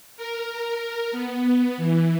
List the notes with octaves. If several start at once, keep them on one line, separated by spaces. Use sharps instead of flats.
A#4
B3
E3